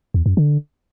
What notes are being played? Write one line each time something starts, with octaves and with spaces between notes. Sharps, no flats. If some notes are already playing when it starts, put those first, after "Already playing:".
E2
F#2
D3